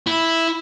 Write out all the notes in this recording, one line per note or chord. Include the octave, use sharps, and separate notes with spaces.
E4